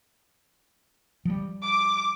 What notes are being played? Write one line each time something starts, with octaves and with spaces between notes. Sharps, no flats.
F3 G3
D6